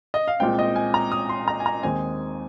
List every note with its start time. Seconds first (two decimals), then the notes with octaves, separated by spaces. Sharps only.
0.14 D#5
0.28 F5
0.40 C2 A#2 G#3 C4 G5
0.59 D#5
0.76 G#5
0.94 A#5
1.12 D#6
1.29 C6
1.48 A#5
1.60 G#5
1.66 A#5
1.83 D#2 D#3 G#3 C4 G#5